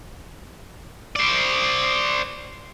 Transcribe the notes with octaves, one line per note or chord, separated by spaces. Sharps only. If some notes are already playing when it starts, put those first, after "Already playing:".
C5 D5